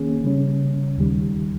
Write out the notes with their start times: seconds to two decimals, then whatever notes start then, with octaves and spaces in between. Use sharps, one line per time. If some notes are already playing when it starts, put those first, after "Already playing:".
Already playing: D#3 A#3 C#4 G#4
0.24 C#3 G3 C#4
0.97 D#2 D#3 G3